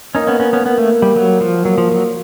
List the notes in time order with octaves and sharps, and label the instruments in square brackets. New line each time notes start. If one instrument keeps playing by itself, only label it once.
[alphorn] A#3 [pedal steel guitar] C#4 D#4
[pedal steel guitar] B3 C#4
B3 C#4
B3 C#4
[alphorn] A#3 [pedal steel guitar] B3
[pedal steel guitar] A3
G3
F#3
F3
[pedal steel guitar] F#3 [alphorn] A#3
[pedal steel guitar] F3
F#3